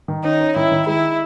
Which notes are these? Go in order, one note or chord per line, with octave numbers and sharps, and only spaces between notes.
D#3
C#4 D#4
C#4
D#3 E4
D#3
G#3 E4